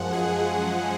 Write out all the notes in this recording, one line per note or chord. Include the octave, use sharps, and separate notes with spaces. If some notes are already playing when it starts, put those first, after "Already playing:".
Already playing: F#2 F3 G#3 F#5
G#4